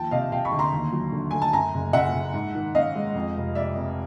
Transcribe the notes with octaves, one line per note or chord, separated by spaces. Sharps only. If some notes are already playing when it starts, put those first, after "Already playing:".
Already playing: D#2 F3 G5 A5
C3 D#5 F5
C3 F5 G5
B5 C#6
D2
A#5 C6
D#2
F#3
D3
A3 G#5
A5
F#2 G#5 A#5
F#1
F#1 E5 F#5
F#1
G#2
D#3
C#4 D#5 F5
G#3
F2
F1
F1 D5 E5
F1